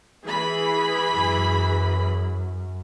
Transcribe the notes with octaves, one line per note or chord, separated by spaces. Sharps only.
E3 G#4 B5
F#2